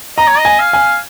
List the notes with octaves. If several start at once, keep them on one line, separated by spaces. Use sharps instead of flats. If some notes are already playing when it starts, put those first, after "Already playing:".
D#5 A#5
C#5
D#5
G#5
F5
G#5